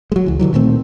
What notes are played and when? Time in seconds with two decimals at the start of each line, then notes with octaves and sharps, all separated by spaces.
0.12 F#3 G#3
0.26 C#2 E3
0.39 G2 D3 E3 F#3
0.54 A#2 D#3 A3 C4